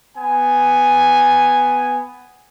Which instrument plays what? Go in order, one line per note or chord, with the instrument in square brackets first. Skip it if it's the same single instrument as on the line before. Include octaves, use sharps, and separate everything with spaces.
[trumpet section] B3 G#5